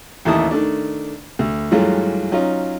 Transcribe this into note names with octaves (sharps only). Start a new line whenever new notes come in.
A1 D#2 E4 A5 D#6
D#3 A3 D4
D2
G2 E3 F#3 G#3 A3 F4
F#3 C#4 D#4 F4